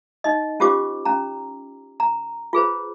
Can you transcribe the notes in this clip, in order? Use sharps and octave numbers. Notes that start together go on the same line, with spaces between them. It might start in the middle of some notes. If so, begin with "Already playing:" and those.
D#4 D#5
C#4 F4 G4 C5 D6
C#4 A#5
A#5
F4 G#4 B4 C5